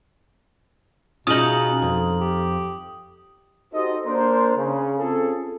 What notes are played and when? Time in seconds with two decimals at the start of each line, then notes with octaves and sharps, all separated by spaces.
1.27 B2 C#4 D#4 F4 G#4 D#5 D#6 F#7
1.82 F2
2.21 G4
3.73 D#4 F#4 G4 A4 C5 D#5
4.05 A#3 D4 A#4 C5
4.57 C#3
4.99 C4 C#4 F4 G#4 A4